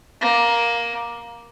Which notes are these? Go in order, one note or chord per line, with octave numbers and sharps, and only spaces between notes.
A#3